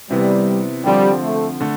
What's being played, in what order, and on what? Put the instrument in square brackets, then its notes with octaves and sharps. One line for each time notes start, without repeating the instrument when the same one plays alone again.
[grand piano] C3 E3 B3 [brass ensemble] G3
[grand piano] D3 F3 C4 [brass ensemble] G3
[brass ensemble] A3
[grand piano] D3 A3